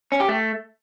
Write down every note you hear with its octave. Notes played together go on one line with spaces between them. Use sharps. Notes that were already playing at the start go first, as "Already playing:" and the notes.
C#4
G4
A3